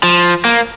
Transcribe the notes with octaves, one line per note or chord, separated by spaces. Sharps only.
F3
A#3